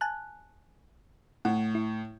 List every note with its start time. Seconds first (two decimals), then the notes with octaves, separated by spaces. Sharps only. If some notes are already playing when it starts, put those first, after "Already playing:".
0.01 G#5 A5 F#6
1.45 A2 F#5
1.75 E4